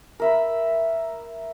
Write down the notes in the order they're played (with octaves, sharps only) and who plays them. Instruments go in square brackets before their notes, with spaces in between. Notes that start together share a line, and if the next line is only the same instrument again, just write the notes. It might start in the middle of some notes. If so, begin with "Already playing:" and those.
[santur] A#4 E5 B5